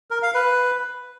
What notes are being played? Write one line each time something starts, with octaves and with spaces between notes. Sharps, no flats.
A#4
F5
B4